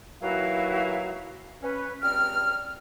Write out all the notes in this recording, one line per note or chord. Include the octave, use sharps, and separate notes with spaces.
D#2 E3 F#3 E4 F#4 F5
C#4 B4
C#2 G3 C4 F6